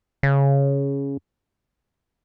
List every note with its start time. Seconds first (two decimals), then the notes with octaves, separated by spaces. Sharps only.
0.23 C#3